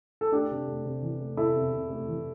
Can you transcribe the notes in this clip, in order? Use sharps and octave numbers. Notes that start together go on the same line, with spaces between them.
A4
A3 D4 G4
C3
A3
C3
E3
A3
C3 E4 A4
C3
C3
A3
E3